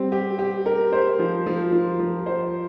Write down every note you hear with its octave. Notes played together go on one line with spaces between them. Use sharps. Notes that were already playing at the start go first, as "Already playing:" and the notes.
Already playing: G3 C4
G4
G4
A#4
C5
F3
F3
F3
F3
C5